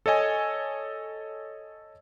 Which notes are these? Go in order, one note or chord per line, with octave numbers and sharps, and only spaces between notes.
A4 C#5 D#5 G#5